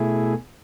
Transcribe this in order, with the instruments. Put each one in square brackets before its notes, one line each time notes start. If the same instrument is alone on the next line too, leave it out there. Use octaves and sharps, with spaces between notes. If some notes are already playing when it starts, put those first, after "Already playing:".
Already playing: [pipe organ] B2 A3 E4 G#4